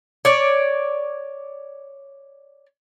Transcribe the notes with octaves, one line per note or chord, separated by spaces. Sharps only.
C#5 D5